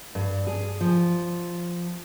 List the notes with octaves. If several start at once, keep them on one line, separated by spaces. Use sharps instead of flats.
G2
G#4
F3